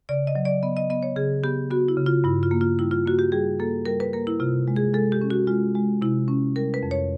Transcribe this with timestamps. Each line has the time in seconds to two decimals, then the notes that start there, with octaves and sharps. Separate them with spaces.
0.09 C#3 D5
0.27 D#5
0.35 F#3
0.45 D5
0.63 B3 D#5
0.77 D#5
0.90 B3 D#5
1.03 C#5
1.16 C#3 G#4
1.44 B3 G4
1.70 B3 F#4
1.88 E4
1.97 C#3
2.06 F4
2.24 G2 E4
2.43 F4
2.51 A#3
2.61 F4
2.79 G3 E4
2.91 F4
3.06 A#3 F#4
3.19 G4
3.32 G3 G#4
3.60 A#3 A4
3.86 G3 A#4
4.00 B4
4.13 A#3 A#4
4.27 E4
4.40 C3 F4
4.68 G#3
4.76 G#4
4.94 G#3 A4
5.12 G4
5.21 C#4
5.30 F#4
5.47 G#3 F4
5.75 G#3
6.02 C3 E4
6.28 C#4
6.56 G3 A#4
6.74 B4
6.83 F2
6.91 C#5